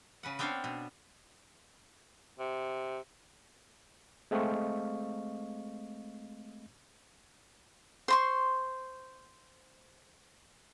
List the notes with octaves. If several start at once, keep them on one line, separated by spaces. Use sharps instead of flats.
C#3 B4 F#5
B3 C4 D4 C5 C#5 F5
B2
C3
G#3 A3 C4 D#5 F5 C#6
C5 C6 C#6